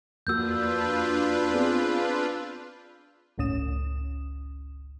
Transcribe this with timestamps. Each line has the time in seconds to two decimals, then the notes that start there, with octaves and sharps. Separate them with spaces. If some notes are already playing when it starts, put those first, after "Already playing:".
0.27 F2 A#3 D4 F4 F#4 B4 E6 G6
1.53 B3 C4 G#4
3.38 G1 C#2 A2 C#4 D#6 E7